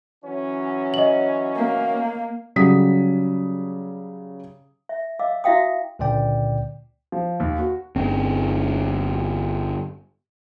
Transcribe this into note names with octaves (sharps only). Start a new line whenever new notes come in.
E3 F#3 C#4
D#5 F#7
A#3
C#3 F#3 G3 D#6 B6
E5
D#5 F5 D6 E6
E4 F#4 E5 F5 G5 D#6
C#2 A#2 D3 D5 G5
F3
D#2
F#4
G1 C4